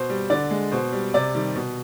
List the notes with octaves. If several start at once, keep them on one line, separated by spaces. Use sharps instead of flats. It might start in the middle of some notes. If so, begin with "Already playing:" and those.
Already playing: B2 C5
G3
D3 D5
G#3
B2 C5
G3
C3 D5
D#3 G3
B2